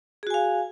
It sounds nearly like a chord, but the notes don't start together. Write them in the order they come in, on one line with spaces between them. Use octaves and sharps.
G#4 F#4 G#5 F5